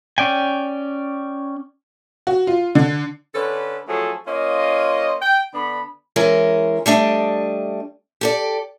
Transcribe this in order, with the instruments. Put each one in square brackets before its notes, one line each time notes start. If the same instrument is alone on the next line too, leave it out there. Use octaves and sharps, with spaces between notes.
[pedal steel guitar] C#4 D5 G5 G#5
[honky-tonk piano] F#4
F4
D3
[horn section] D3 C#4 A4 B4
F3 F#3 A3 C#4 G#4 A4
A#3 C#4 F4 C5 D#5
G5
D3 B3 D4 B5
[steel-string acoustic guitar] E3 G#3 C#4 A#4
G3 A3 D4 D#5
G4 A4 D5